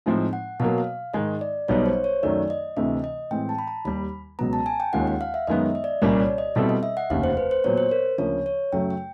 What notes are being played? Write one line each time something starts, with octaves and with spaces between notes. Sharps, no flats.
A2 F3 G#3 C4 D#4
F#5
B2 F#3 A#3 F5
F5
G#2 D#3 G#3 D#5
D5
B1 B2 G3 B3 D#4 C#5
C5
C#5
F#2 D#3 F#3 A3 D5
D#5
D2 C3 E3 A3 C4 D#5
D#5
A2 E3 G#3 C4 G5
A5
B5
A#5
D#2 D#3 G3 B5
C#2 B2 F#3 B3 A#5
A5
G#5
G5
D#2 D#3 G#3 C#4 F4 F#5
F#5
F5
E5
F#2 D#3 G#3 B3 D#5
E5
D#5
D5
C2 A#2 G3 A#3 C#4 C#5
D5
D#5
B2 G3 C4 E4 A4 D#5
D#5
E5
F#5
F1 D#2 C#3 F5
C5
B4
C5
A#2 F#3 B3 C#5
C5
A#4
D2 C#3 F3 A#3 C#5
C#5
F#2 C#3 F#3 A3 G5
G5